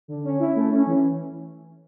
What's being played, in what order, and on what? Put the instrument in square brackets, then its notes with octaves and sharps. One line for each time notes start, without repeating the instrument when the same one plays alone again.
[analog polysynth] D3
C#4
E4
A3
C#4
E3